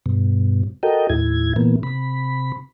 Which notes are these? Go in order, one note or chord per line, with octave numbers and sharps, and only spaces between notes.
G2 B2
F#4 A4 A#4 D#5 G5
D#2 A2 E4 G#6
A#2 E3 A#3 B3
C3 B5